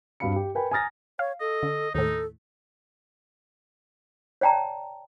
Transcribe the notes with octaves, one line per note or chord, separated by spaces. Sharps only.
G2 C4 F#4 F5 B5 C#7
G4
A#4 B4 G5 G#5 B5
G#5 A#5 D#6 F6 A6 A#6
C#5 F5
A4 D#5
D3
D#2 A2 D#4 A4
C#5 D5 G5 A5 A#5